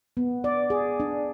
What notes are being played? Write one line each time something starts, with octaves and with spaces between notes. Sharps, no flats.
B3
D5
G#4
D4